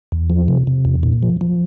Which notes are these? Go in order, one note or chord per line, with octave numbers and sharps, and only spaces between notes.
E2
F3
C3
C3
E2
A#2
F3
F3